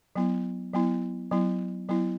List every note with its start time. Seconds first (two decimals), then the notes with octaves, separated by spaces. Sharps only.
0.16 F#3 B3 E4
0.73 F#3 B3 E4
1.31 F#3 B3 E4
1.89 F#3 B3 E4